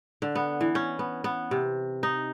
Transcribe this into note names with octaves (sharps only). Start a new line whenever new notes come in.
D3
B3
E3
C#4
B3
B3
C3
D#4